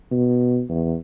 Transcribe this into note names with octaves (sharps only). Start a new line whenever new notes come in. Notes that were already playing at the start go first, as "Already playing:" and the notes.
B2
E2